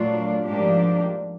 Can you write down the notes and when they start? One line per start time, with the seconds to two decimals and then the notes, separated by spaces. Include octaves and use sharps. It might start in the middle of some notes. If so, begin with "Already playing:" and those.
Already playing: A#2 F#3 A3 D4 F4
0.44 G#2 F3 A#3 D4 G4